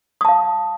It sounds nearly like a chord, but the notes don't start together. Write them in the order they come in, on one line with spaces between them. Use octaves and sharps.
D#6 A5 F5